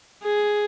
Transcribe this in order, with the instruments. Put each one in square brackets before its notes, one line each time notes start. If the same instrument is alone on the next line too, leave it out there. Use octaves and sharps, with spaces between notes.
[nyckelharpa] G#4